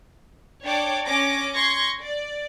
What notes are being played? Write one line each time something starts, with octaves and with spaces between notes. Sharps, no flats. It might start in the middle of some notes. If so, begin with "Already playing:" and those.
D4 C#5 D5 G5 D6
C#4 D6 A#6
C6 C#6 G#6 A#6
D5